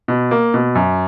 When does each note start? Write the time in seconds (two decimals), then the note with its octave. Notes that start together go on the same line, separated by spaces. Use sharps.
0.08 B2
0.31 A#3
0.54 B2
0.75 F#2